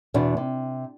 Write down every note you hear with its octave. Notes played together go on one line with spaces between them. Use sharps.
E2 B2 D4
C3